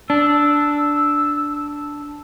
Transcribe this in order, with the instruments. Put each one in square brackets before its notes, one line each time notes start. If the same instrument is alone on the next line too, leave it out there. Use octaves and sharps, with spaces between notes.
[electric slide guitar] D4 [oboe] E6